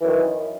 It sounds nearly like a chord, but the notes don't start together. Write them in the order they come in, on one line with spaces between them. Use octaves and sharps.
E3 F#2 D#3